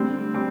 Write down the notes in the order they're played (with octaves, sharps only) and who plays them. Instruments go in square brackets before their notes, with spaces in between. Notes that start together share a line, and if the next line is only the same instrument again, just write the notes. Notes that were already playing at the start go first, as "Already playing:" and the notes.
Already playing: [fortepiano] D3 G3 C4 [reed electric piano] A3
[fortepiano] G3 C4